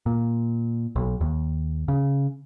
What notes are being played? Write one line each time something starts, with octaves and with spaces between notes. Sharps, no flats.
A#2
B1
D#2
C#3